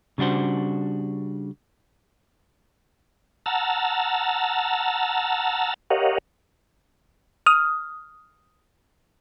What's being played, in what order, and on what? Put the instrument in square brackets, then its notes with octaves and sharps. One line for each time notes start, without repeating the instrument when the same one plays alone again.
[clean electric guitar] C#3 G3 D4 F#4 C5
[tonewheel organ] F#5 A5 A#5 E6 F6
G4 A#4 C#5 D#5 F5 F#5
[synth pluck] D#6 F6